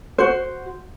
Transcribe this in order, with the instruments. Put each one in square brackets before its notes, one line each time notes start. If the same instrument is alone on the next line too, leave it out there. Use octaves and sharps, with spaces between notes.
[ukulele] F#4 C5